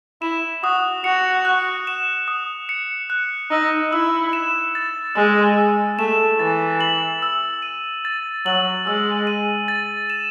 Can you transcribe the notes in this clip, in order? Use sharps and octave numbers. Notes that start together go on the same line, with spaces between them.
E4 E7
F#4 D#6
F#4 C#7
F#6
E7
D#6
C#7
F#6
D#4 E6
E4 E6
E7
A6
G#3 E6
E6
A3 E7
E3 A6
F#7
E6
D#7
A6
F#3 F#7
G#3 E6
D#7
A6
E7